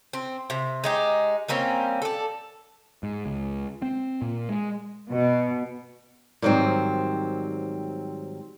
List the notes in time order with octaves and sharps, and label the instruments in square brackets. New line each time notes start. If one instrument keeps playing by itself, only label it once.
[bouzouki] C4
C3
G#3 D#4 G4
G3 A#3 C4 C#4
A4 D5
[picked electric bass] G#2
C#2
C4
A#2
G#3
[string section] B2
[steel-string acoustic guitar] G#2 D#3 F#3 G3 C4